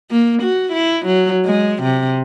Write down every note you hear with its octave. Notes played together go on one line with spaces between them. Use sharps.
A#3
F#4
E4
F#3
G#3
C3